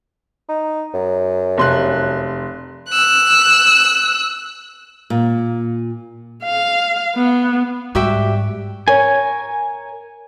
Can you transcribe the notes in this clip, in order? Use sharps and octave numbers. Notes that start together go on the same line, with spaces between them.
D#4
F#2
F1 C6 F#6
E6 F#6
A#2
F5
B3
G#2 G3 F#4 G4 E5
A#4 C#5 G#5